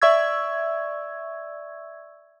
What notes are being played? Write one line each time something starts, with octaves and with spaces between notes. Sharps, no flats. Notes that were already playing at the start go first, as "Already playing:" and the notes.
D5 E5 C#6 E6 G#6